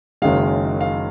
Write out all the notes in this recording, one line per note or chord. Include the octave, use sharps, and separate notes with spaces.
F#1 F#2 D#3 G#3 F5
F5